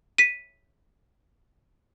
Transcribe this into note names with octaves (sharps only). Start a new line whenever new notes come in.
B6 D#7